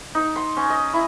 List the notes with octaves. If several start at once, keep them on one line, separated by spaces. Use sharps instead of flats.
D#4
C6
C#4
D#5
E4